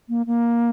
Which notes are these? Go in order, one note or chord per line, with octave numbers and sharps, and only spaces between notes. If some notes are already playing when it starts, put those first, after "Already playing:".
A#3
A#3